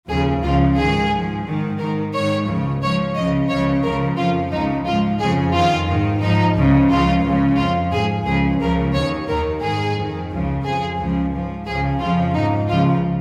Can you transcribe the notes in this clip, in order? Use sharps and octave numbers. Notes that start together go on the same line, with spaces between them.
D#2 C#3 F3 G#4
C#2 C#3 F3 F4
G#2 D#3 G#4
G#2 F3
G#2 D#3
G#2 D#3 A#4
G#2 D#3 C#5
C#2 C#3 F3
G#2 F3 C#5
C#2 C#3 F3 D#5
C#2 C#3 F3 C#5
C#2 C#3 F3 A#4
F2 F3 F4
C#2 C#3 F3 D#4
G#2 F3 F4
F2 C#3 F3 G#4
F2 D#3 F4
G#2 D#3
G#2 F3 D#4
C#2 C#3 F3
C#2 C#3 F3 F4
C#2 C#3 F3
F2 F3 F4
G#2 F3 G#4
C#2 C#3 F3 G#4
C#2 C#3 F3 A#4
D#2 D#3 C#5
D#2 D#3 A#4
G#2 D#3 G#4
F2 D#3
C#2 C#3 F3
F2 F3 G#4
C#2 C#3 F3
G#2 F3
C#2 C#3 F3 G#4
F2 C#3 F3 F4
G#2 F3 D#4
C#2 C#3 F3 F4